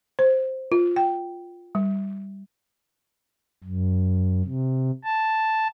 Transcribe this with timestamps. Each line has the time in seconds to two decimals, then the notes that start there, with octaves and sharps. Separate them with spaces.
0.19 C5
0.72 F4
0.96 G5
1.75 G3
3.64 F#2
4.45 C3
5.04 A5